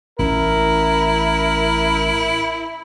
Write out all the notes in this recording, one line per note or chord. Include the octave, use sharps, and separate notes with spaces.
A1 C#4 E4 A#4